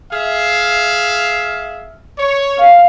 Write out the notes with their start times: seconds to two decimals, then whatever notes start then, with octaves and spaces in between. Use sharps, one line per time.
0.11 G#4 E5 F5
2.17 C#5
2.58 F5